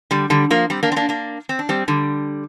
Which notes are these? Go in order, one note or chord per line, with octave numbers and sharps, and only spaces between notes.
D3 G3
D3 G3
F3 A#3
G3 C4
A#3 D4
C4
A#3 D4
A#3 D4
C4
D4
G3 C4
D3 G3